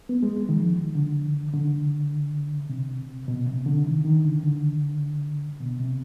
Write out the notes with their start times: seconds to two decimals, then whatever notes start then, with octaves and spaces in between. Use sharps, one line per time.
0.09 B3
0.23 G#3
0.49 D#3
0.57 F3
0.95 D3
1.54 D3
2.69 C3
3.28 B2
3.47 C3
3.66 D3
3.85 D#3
4.04 D#3
4.24 D3
4.43 D3
5.60 B2
5.80 C3